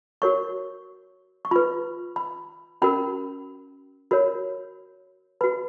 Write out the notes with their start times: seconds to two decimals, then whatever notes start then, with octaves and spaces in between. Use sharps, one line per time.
0.22 F#4 A#4 C#5 C#6
1.45 C#6
1.51 F4 B4 B5
2.16 B5
2.82 C#4 F#4 A#4 B5
4.11 F#4 A#4 C#5 B5
5.41 F#4 B4 B5